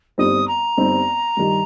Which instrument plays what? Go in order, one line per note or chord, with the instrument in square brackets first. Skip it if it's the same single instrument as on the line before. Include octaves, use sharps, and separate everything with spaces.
[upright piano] G1 G2 G3 C4 D#4 [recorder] D#6
[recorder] A#5
[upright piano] G1 G2 G3 C4 D#4
G2 D#3 G3